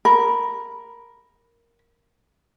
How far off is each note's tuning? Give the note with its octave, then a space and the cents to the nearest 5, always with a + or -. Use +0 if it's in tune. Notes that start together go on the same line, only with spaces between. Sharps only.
A#4 +0 B5 +0